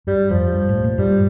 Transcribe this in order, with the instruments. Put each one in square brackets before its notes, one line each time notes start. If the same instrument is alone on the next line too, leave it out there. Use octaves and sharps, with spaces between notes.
[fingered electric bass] G2 [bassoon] G3
[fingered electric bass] F2 [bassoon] F3
[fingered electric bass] G2
A2
A#2
[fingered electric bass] G2 [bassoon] G3